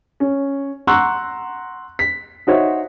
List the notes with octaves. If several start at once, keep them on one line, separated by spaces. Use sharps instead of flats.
C#4
F#5 A#5 C6 C#6 E6 F#6
B6
D#4 F#4 C5 C#5 E5